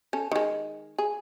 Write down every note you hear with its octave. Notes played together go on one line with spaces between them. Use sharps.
C#4 A4
D#3 G#3
G#4